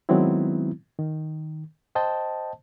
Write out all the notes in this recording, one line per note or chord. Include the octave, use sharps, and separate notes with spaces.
D#3 F#3 G#3 B3 C4 E4
D#3
C5 D#5 G5 A5